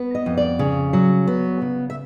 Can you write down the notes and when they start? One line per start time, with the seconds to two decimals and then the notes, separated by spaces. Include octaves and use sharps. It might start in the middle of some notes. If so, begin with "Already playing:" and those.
Already playing: B3
0.15 D#5
0.26 F2
0.37 D5
0.59 C#3
0.93 F#3
1.27 B3
1.62 C#3
1.90 E5